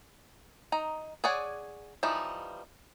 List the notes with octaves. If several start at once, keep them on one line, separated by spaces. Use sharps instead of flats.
D#4 A#5
G#4 C#5 D5 F#5 G#5
E3 F3 G3 D#4